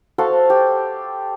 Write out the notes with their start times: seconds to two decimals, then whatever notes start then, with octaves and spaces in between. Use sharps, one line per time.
0.18 F#4 A4 C5 F5
0.50 G4